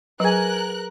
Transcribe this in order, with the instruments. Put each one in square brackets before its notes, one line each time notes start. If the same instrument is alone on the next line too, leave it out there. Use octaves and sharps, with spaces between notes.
[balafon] F#3 [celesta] G#4 B4 [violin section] A#4 F#6 [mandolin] F#5 G#5